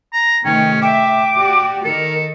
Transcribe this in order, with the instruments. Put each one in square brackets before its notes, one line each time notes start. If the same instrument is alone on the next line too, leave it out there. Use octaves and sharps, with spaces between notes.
[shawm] A#5
[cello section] C3 D#3 A3 [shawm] C#4 [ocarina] G5
[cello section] E5 [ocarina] G5 [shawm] D6
[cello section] F#4 G4 D5
[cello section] D#3 [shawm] A4 [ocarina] A#4